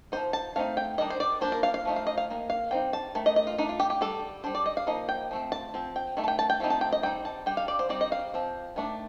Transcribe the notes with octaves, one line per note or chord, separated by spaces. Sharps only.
F3 C4 D#4 C5
A5
A3 C4 D#4 F5
G5
D#3 G3 D4 D#5
C5
D5
F3 A#3 D4 C5
A#4
F5
F5
F3 A3 D#4
F5
D#5
F5
D#3 A#3
F5
G3 C4 D#4 G5
A5
D#3 A3
D#5
D#5
F4
A3 D4 D#4
F4
G4
G4
G3 D4 A4
G3 D4 C5
D5
D#5
F5
F3 A#3 D#4 D#5
G5
F3 A3 C4
A5
F3 C4
G5
D#3 A3
A5
G5
A5
G5
F3 A3 C4 D#4
A5
G5
D#5
G3 C4 D#4 G5
A5
G3 D4 G5
F5
D5
C5
G3 C4 D#4 D5
D#5
F5
F3 C4
D#3 A3 D4